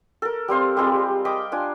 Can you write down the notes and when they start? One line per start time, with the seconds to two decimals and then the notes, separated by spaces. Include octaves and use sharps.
0.22 A4 A#4
0.48 G3 C4 C5 F5
0.77 G3 G#3 C4 F4
1.25 D#5 G5 B5 D6
1.52 D4 F4 G#5